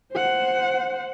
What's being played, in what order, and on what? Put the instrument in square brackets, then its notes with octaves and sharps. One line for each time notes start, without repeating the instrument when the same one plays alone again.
[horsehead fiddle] C5 F#5